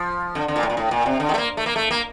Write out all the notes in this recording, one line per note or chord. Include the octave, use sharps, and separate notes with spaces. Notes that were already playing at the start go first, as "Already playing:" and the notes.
Already playing: F3
D3
D3
A#2
A2
A#2
A2
A#2
C3
D3
D#3
A3
A#3
A3
A#3
A3
A#3